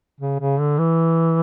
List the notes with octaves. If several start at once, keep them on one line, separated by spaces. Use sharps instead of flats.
C#3
C#3
D3
E3